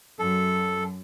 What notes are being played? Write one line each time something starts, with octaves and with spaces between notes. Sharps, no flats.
F#2 F#3 A4